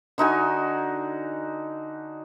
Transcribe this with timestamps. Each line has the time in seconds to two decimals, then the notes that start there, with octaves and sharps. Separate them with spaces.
0.18 D3 D#4 F#4 G#5